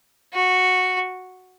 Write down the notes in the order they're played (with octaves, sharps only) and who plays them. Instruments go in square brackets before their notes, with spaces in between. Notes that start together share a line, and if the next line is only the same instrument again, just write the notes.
[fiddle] F#4